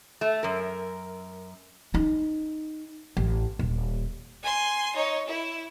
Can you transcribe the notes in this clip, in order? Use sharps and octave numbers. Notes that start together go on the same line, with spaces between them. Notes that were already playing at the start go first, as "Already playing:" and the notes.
A3
F#2 A#4
C#4 D#4
A1
D#1
G#5 C6
D#4 C#5
E4